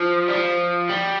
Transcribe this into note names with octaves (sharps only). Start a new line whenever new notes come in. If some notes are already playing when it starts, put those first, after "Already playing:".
Already playing: F3
G3
F3
G3